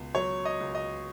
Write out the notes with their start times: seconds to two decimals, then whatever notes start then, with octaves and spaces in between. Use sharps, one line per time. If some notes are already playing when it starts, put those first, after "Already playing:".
Already playing: C#2 B2
0.15 F#3 C#5
0.45 D#5
0.60 C#2
0.75 D#5